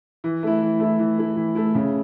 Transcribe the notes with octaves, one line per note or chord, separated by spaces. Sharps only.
E3
A3 E4
E3
A3 E4
E3
A3 E4
E3
A3 E4
C#3